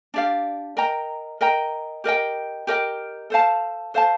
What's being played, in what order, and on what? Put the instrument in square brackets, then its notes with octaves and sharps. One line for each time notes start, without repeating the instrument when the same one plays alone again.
[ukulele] D4 G4 D5 F5
A#4 D#5 G5 A#5
A#4 D#5 G5 A#5
G4 A#4 D#5 G5
G4 A#4 D#5 G5
A4 C5 F5 A5
A4 C5 F5 A5